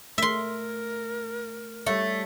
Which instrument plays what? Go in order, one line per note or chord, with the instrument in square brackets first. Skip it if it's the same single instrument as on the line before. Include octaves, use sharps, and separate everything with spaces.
[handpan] A3 [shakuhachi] A#4 [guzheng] E5 C6
[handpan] G3 C#5 E5 [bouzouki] A3